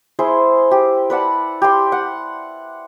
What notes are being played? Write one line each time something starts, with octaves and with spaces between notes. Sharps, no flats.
E4 G#4 C5
G4
B4 D5 F#5 A5
G4 C6
F#5